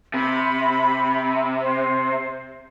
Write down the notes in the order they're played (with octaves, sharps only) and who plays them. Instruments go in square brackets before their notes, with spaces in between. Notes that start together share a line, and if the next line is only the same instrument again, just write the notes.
[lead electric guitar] C3 [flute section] B5
[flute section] C5